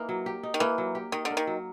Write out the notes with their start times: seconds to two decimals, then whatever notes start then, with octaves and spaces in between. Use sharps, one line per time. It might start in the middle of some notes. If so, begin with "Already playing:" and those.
Already playing: E3 A#3 D#4
0.09 F#3
0.26 G4
0.43 D#4
0.54 D#3
0.60 E3 A#3
0.78 F#3
0.95 G4
1.12 D#3 D#4
1.25 D3
1.31 A#3
1.37 D#3
1.47 F#3